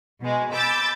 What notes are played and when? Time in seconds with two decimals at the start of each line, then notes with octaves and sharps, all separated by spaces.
0.21 B2 G#3
0.53 B5 D6 E6 G6 A6